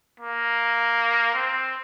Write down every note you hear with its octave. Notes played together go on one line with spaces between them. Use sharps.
A#3
C4